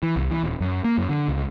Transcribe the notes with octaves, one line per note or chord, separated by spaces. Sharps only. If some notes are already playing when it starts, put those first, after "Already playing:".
E3
C2
E3
D#1
F#2
A#3
F#2
D3
C#2